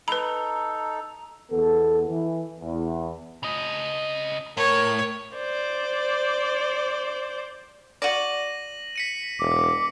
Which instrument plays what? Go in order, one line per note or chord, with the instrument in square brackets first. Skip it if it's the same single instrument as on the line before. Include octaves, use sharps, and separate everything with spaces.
[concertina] D#4 A4 [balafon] B4 B5 [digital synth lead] A#5
[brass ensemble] E2 B3 A4
E3
E2
[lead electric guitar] C#3 D#5
[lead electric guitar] A2 [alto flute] A#4 [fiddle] C#5
[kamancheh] C5 D5
[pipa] F#4 D5 [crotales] A#6 D#7 F#7
[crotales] B6 C#7 D#7
[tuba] E1 [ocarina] D6